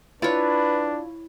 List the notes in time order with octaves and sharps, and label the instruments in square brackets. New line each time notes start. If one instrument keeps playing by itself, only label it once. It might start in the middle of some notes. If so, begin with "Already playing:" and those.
[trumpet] D4 [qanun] E4 C#5 [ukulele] F4 [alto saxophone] B4